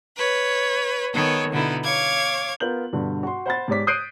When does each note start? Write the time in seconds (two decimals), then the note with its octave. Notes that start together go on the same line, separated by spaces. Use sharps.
0.17 B4 C#5
1.13 D#3 B3 A4 C#5
1.51 B2 D3 B3 D#4 E4
1.84 C#5 F5 D6 G#6
2.60 B3 F4 A#4 G6 F#7
2.93 G2 B2 D3
3.23 F#4 C6
3.46 C5 F#5 B5 G6 A6
3.68 G#2 G4 C#5 D5 D6 B6
3.87 D#6 F#6 G6 C7 D7 D#7